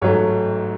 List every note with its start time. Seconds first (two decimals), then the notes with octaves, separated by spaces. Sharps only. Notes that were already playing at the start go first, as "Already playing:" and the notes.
0.01 A1 G#2 F#3 A3 C#5